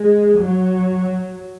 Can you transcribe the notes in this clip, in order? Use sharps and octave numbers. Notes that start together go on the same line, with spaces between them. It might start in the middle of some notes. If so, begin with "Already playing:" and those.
Already playing: G#3
F#3